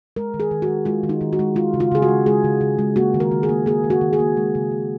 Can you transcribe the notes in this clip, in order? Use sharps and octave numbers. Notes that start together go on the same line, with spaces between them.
G#3 A#4
D#3
G#4
D#3
F#4
G#3
G#3 F4
D#3
D#4
D#3
F#4
G#3
G#3 F4
C#3
F4
C#3 G#4
F#4
G#3
G#3 G#4
C#3
C#3
G#3
A#3 F#4
D#3
A#4
D#3
G#4
A#3
A#3 G#4
D#3
F#4
D#3
G#4
A#3
G#3
C#3
C#3